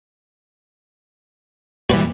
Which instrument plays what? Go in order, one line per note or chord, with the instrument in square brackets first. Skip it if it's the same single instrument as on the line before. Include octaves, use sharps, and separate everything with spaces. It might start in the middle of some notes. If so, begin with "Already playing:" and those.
[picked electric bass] F2 G#3 A#3 [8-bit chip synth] E3 G3 [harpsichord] F#4 B4